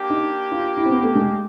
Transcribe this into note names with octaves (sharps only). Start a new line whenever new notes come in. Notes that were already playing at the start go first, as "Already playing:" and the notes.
Already playing: A#3 D4 G4
D#4
F4
E4
C4
B3
A3
G#3